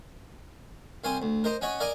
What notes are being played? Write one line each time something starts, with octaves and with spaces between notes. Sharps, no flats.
C2 C4 F5 G#5 C6
D2
A#4 C5 D#5 A#5
C#4 F#4 C#5 D#5
A#4 D5 D#5 F5 G#5 A#5